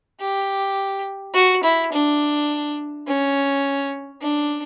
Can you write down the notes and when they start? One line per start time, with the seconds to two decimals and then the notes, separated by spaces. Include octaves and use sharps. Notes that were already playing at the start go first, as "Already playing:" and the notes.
0.20 G4
1.34 F#4
1.64 E4
1.92 D4
3.07 C#4
4.22 D4